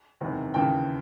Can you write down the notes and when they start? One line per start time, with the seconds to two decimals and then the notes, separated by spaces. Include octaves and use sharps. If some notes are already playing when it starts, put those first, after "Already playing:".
0.21 F#1 E2 C3 D#3
0.54 D#2 C#3 E3 G5 A5